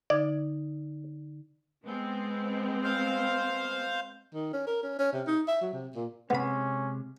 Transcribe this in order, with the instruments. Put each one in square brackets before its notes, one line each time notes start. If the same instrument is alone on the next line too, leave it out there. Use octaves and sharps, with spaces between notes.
[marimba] D3 D#4 G#6 [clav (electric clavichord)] D5
[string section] G#3 B3 C4
[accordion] C5 F5
[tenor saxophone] D#3
C#4
A#4
C#4
C#4
C3
D#4
E5
F#3
C3
A#2
[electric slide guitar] C3 G#3 [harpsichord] B3 B5 [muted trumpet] C#4